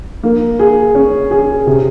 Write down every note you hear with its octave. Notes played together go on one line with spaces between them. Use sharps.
A#3
G#4
C#4
G#4
C3